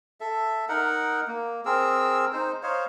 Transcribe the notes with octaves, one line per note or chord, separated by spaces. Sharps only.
A4 E5
D#4 A#4 F#5
A#3
C4 G#4 A#4 E6
D#4 C5
C5 C#5 D#5 F5